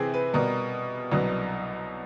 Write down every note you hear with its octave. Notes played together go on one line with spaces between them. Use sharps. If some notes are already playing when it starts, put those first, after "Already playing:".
Already playing: C3 E3 C4 G#4 B4
B4
B2 G3 B3 A#4
C2 B2 F#3 B3 D4